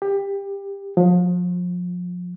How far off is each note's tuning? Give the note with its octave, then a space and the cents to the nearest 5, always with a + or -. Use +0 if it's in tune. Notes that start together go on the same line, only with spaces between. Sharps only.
G4 +20
F3 +35